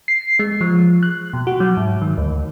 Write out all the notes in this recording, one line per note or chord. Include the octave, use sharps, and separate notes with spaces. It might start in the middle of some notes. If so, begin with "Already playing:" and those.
C7
G#3
F3
F#6
B2
F#4
F#3
G#2
D#3
D2